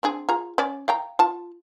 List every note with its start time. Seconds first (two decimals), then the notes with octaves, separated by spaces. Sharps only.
0.03 C4 D4 G#4
0.29 F4 G#4 A#5
0.58 C#4 C#5 D5
0.88 F5 G5 A#5
1.19 F4 A5